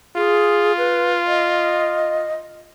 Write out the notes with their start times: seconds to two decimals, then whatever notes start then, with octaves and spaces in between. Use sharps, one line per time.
0.16 F4 G#4
0.78 B4
1.26 D#5